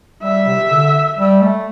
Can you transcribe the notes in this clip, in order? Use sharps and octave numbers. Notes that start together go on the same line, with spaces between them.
G3 E5
C3
D3
G3
A3